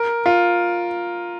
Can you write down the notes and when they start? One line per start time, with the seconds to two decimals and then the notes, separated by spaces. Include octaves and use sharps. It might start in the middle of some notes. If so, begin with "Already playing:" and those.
Already playing: A#4
0.26 F4